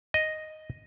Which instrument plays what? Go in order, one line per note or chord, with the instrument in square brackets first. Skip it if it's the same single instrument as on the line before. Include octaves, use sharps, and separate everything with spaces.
[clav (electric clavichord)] D#5